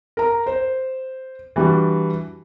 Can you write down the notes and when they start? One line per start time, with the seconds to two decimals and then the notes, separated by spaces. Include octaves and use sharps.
0.17 A#4 A#5
0.46 C5
1.56 E3 G3 D4 F#4